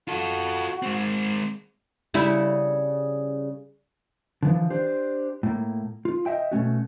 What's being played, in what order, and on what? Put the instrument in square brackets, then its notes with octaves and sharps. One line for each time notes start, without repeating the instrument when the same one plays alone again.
[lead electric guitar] F4 A4 [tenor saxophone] F#4
[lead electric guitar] G#3 C4
[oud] C#3 G3 E4
[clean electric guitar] D3 E3 F3
D4 G4 C5
A2 A#3
F4
D#5 E5 G5
B2 A3 C#4 F#4